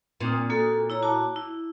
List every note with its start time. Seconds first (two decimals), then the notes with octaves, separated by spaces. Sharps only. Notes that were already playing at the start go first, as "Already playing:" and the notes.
0.20 A#2 C4 D4 D#6
0.50 A#3 F#4 A4
0.90 E4 C#5 A#5
1.03 F#4 A5 D6
1.36 E4